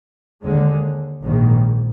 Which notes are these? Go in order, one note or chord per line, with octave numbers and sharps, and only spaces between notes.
D#2 D3 G#3
A#1 G#2 D#3